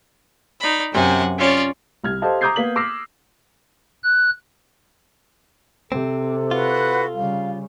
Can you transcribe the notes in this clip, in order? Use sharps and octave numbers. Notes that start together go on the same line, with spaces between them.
D#4 D5 B5
F#2 C3 F#5 G#5
C#4 F4 C#5 D5
C2 F6 G#6
G4 A4 C5 D#5 F5 A5
A#5 D6 D#6 G6 G#6 C7
A#3 B3 B6 F#7
D6 E6 F6 A#6 C7
F#6
C3 C4 A4
F4 F#4 B4 F#5
C#3 G3 F5